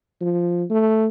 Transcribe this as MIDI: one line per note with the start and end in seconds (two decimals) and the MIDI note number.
0.21 0.63 53
0.70 1.08 57